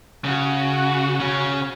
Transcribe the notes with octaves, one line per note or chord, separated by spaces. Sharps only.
C#3 F#4
C#3 C#4